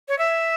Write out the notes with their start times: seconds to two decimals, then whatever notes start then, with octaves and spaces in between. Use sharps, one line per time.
0.08 C#5
0.19 E5